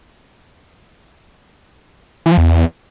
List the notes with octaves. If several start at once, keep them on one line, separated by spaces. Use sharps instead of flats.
E3
F3
E2